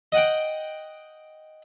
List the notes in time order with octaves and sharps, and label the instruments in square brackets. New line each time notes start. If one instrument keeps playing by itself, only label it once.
[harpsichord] D#5 F#5 G5